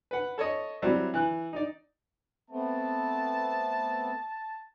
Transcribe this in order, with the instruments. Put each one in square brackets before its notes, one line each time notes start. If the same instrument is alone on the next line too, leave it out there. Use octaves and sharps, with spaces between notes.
[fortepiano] B4 F#5
A4 C#5 D#5 D#6
F#3 G3 C4 E4 E5
E3 F#6
D#4 D5
[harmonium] A3 B3 C4 [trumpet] A5